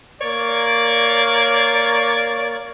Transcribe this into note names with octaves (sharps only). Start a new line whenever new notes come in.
A#3 C#5 D5